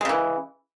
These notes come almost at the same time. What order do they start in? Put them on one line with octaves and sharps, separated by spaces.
G#3 C#3 E3